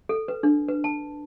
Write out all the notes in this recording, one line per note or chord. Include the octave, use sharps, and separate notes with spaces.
A4
B4
D4
B4
A5